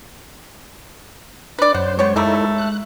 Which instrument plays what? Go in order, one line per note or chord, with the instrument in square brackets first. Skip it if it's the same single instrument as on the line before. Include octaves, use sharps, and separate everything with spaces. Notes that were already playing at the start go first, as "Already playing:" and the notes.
[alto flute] D4 [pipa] B4 D5 [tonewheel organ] F#6
[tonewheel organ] F#2 C5 [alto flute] C#5 [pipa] F#5
[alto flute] G#3 [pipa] B3 G4 C#5
[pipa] G3 A3 A#3 [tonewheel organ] D#4 E4 A4
[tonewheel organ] F#6